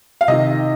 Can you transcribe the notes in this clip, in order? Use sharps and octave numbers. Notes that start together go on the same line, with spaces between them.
F5
C3 D#3 D#5